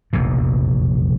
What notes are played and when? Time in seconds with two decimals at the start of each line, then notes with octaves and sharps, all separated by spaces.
0.13 F1 A#1 E2 B2